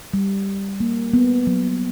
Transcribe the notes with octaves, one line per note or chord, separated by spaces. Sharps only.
G3
A#3
B3
F#3